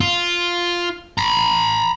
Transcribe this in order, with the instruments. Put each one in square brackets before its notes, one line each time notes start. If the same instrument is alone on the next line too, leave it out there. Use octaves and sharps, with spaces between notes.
[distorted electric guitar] F4
A#5 B5